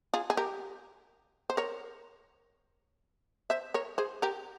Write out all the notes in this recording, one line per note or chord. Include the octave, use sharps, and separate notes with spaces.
F4 G#4
G#4
G4 A#4
C5
A#4 C#5
C5 E5
A#4 C#5
G#4 C5
G4 A#4